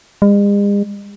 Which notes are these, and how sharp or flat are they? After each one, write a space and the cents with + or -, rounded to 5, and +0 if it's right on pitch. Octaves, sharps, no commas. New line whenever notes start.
G#3 -45